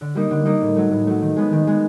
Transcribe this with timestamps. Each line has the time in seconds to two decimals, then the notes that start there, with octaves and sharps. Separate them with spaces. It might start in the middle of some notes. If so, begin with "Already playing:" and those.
0.01 D3
0.15 G3 A#3 D#4
0.31 D3
0.45 G3 A#3 D#4
0.61 A2
0.76 F#3 A3
0.91 A2
1.07 F#3 A3
1.22 D#3
1.36 G#3 B3
1.52 D#3
1.67 G#3 B3